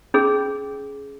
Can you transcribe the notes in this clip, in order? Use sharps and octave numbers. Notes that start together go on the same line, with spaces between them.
C#4 G#4